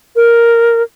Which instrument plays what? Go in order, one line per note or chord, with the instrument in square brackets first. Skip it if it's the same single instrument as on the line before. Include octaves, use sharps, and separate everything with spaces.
[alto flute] A#4